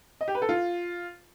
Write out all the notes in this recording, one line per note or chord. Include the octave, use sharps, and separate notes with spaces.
D#5
G4
B4
A4
F4